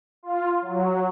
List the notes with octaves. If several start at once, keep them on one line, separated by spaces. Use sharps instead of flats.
F4
F#3